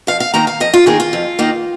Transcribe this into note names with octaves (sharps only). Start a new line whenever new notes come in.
F2 F5
F5
D#3 A#3 D#4 A#5
F5
F2 D#5
F4
D#3 A#3 D#4 G#4
F4
F2
D#3 A#3 D#4